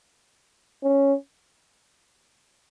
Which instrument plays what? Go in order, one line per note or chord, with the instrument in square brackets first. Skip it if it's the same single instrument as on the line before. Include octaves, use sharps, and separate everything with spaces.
[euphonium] C#4